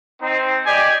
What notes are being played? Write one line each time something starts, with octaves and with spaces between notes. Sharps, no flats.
C4 D#4
G4 D5 D#5 G#5